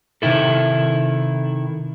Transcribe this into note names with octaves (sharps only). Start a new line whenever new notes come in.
C3 D#3 E4 A4